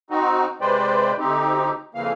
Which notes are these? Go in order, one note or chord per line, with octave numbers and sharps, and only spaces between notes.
C4 D#4 F#4
C3 G#3 B4 C5 D5 G5
D2 C4 D#4 G4
F2 C#3 E3 A#3 F5